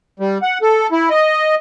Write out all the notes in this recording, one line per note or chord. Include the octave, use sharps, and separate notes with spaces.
G3
F#5
A4
E4
D#5